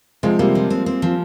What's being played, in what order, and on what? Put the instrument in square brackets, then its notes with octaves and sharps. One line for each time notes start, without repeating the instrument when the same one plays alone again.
[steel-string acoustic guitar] C3 [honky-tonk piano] F3 G#3
[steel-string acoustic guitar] C3 [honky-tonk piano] G3 A#3
[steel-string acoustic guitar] F3
C4
C4
F3